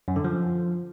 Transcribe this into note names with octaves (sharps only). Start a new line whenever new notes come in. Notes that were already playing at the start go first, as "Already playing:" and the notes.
F#2
D3
F3